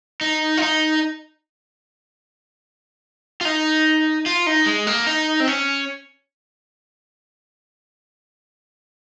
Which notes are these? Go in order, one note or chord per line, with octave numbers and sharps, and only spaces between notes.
D#4
F4
D#4
F4
D#4
F4
D#4
G#3
A#3
D#4
C4
C#4